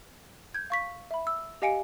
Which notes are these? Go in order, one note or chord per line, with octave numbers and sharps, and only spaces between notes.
G6 G#6
F5 C#6 B6
E5 B5
E6
G4 D#5 F5 G#5 C#7 D7